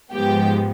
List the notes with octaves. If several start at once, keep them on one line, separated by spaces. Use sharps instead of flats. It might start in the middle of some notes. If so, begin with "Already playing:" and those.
G#2 F3 G#3 B3 G4 G5